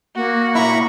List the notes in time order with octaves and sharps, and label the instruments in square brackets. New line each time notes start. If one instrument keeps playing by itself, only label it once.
[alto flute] A#3 [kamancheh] F#4
[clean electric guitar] A#2 E4 [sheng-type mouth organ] A#5 B5 C#6